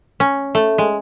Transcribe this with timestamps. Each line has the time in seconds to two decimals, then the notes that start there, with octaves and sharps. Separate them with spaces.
0.20 C#4
0.55 A3
0.78 G#3